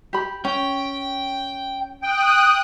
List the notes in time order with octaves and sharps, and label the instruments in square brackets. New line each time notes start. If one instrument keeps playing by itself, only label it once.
[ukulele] G4 B5
[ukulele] C#4 [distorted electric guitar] G5
[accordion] G5 [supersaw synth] D#6 F#6